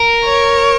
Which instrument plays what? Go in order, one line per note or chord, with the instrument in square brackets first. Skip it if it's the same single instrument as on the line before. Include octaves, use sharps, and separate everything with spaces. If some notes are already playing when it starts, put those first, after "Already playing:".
Already playing: [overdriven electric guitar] A#4
[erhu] C#5